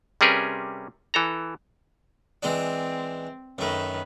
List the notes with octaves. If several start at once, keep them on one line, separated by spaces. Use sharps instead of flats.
C3 G3 C#4 G#4 A#4 B4
E3 A4 A#5
E3 G#3 C4 D4
F#2 D#3 A3 B4